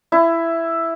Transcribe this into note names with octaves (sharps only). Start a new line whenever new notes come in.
E4